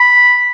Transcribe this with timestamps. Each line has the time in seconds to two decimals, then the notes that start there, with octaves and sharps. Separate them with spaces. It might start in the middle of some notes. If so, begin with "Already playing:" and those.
Already playing: B5